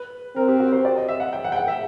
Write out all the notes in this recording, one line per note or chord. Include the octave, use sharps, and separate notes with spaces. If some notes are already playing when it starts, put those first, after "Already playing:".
Already playing: B4
C4 A#4
G4
F#4
C5
D5
D#5
E5
F#5
G5
F#5
G5
F#5
E5